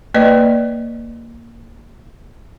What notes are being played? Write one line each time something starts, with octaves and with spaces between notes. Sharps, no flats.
A#3 B4 D5 D#5